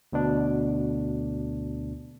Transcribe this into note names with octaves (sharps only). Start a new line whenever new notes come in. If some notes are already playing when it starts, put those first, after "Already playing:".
D2 B2 D4